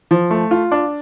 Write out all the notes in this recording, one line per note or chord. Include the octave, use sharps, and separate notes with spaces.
F3
A3
F4
D4